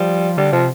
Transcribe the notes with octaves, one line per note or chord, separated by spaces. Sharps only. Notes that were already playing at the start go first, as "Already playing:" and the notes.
Already playing: F3 G3
D3 G3
C3 F3